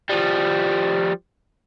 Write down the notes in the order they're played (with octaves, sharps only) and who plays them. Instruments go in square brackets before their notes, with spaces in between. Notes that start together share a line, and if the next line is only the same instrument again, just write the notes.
[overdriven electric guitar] F3 G3